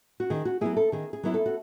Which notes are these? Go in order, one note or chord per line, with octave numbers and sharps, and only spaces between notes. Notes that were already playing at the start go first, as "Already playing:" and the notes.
F#4
D#3 G#4
F#4
F#3 B3 E4 G#4
A4
D#3 G#4
G#4
F#3 B3 E4
A4
F#4